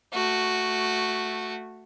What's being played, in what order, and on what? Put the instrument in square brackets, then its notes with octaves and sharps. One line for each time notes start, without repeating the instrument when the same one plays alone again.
[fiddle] A3 F#4